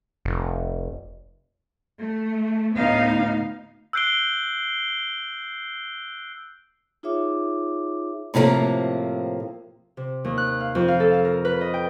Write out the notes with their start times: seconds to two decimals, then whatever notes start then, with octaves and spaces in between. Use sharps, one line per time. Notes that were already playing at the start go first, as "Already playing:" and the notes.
0.25 F1
1.99 A3
2.75 D2 A2 B3 D#4 F5
3.93 E6 F#6 G6 C7 D7 G7
7.03 D#4 F4 G#4 C#5 E5 D6
8.34 A2 C3 F3 G3 A#3
9.97 C3
10.25 D#2
10.38 F#6
10.61 F5
10.75 F2
10.88 F5
11.00 A4
11.13 F5
11.25 A#4
11.45 B4
11.61 D#5
11.74 G5